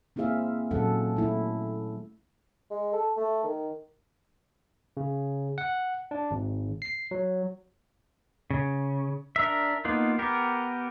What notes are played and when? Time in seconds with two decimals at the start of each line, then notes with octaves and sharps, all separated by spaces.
0.16 A#3 C4 E4 G#4 E5 F5
0.71 A#2 D#3 F#3 C#4 A4 F#5
1.16 A3 E4
2.71 G#3
2.93 A4
3.17 A3
3.44 D#3
4.97 C#3
5.58 F#5
6.11 D4
6.31 G#1
6.82 C7
7.11 F#3
8.51 C#3
9.36 D4 A#4 E5
9.85 A#3 B3 D#4 F4
10.19 B3 G4 A#4